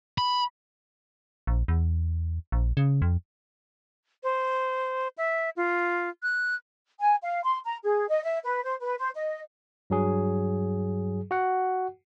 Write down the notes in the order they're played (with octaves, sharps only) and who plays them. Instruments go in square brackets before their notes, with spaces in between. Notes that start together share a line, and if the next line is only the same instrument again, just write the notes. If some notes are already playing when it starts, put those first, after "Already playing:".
[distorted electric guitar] B5
[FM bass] A#1
E2
A#1
C#3
F2
[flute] C5
E5
F4
F#6
[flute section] G#5
F5
C6
A#5
G#4
D#5
E5
B4
C5
B4
C5
D#5
[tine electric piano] G2 F#3 G#4
F#4 F#5